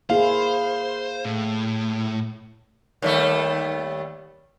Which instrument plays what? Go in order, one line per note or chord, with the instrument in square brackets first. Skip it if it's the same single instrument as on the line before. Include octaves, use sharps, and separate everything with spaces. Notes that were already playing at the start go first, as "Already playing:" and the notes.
[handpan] A#3 E4 G#4 [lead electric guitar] C5 [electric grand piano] F5
[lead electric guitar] A2
[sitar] D#2 G3 A3